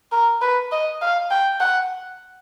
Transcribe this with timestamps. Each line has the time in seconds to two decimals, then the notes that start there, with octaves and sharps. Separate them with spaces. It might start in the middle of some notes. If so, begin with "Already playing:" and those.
0.12 A#4
0.42 B4
0.71 D#5
1.01 F5
1.31 G5
1.61 F#5